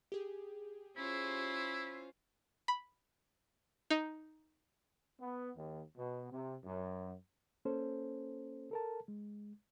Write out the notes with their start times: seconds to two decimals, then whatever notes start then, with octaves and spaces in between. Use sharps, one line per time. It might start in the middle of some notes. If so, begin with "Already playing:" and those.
0.12 G4 G#4
0.97 C#4 E4 F4 C5
2.68 B5
3.90 D#4
5.20 B3
5.56 D#2
5.97 B2
6.32 C3
6.65 F#2
7.65 A#3 C#4 A4 C5
8.71 A4 A#4 A5
9.08 G#3